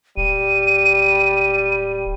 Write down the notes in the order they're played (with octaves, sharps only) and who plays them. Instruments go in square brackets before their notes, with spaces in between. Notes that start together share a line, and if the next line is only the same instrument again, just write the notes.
[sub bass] D1 [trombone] G3 [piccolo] D#7